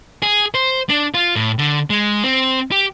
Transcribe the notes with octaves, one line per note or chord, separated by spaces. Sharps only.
G#4
C5
D4
F4
A2
D3
G#3
C4
G4